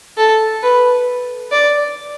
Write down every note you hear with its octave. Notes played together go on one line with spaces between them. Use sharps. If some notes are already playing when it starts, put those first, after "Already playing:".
A4
B4
D5